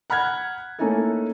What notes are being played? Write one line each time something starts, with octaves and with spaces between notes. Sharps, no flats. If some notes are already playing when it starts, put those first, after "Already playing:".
F#5 B5 F6 F#6 G#6
A3 A#3 C#4 D#4 E4 A4